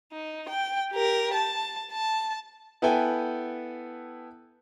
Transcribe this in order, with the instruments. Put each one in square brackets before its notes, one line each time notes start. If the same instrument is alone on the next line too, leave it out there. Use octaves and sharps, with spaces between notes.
[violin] D#4
G5
G4 A#4
A5
A5
[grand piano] B3 E4 A4 B4 G5 G#5